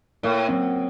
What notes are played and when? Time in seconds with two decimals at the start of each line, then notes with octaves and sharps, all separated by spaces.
0.23 A2 A#3
0.48 F#2 C4